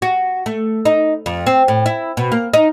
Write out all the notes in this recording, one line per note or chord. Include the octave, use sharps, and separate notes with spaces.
F#4
A3
D#4
F2
C4
A2
E4
B2
A#3
D#4